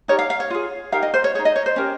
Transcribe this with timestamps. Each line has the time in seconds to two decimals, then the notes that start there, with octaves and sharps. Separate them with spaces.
0.08 D#4 G4 A#4 C#5
0.19 F5
0.30 F5
0.40 C#5
0.50 F4 G#4
0.92 D#4 G4 A#4 F5
1.03 D#5
1.14 C5
1.24 C#5
1.35 D#4 G#4 C#5
1.45 D#5
1.56 C#5
1.66 C5
1.76 C#4 G4 A#4